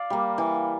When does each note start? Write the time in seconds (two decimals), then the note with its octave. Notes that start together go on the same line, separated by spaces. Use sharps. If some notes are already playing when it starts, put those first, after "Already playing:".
Already playing: D5 F5
0.10 G3 A#3
0.38 E3